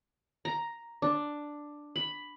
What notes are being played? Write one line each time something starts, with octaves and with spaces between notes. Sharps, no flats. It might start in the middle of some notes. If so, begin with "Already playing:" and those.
A#5
D4
B5